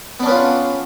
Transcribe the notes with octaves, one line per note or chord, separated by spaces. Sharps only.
B3 C#4 D4 F4 B4